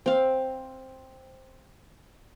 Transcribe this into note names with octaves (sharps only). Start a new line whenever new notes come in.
C4 F5